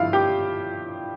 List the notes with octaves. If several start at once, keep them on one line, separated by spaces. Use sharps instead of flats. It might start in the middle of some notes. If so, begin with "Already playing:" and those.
Already playing: G2 D3 F3 E4 F4 F5
G4 G5